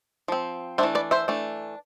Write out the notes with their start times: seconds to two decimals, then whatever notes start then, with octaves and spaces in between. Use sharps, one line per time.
0.28 F3 C4
0.78 E3 A3 D4 C5 E5
0.95 B4 D5
1.11 C5 E5
1.28 E3 A3 D4